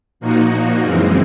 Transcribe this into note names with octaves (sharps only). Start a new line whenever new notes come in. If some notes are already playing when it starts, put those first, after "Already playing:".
A#2 F3 A#3 D#4 F#4
F#2 C#3 E3 G#3 C4